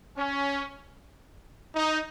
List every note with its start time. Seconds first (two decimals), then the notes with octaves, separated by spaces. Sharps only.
0.17 C#4
1.74 D#4